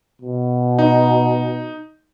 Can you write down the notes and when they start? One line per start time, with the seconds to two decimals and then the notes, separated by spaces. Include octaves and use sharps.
0.21 B2
0.79 D#4